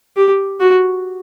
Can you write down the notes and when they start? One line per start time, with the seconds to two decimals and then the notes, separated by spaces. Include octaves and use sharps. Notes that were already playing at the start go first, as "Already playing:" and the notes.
0.17 G4
0.60 F#4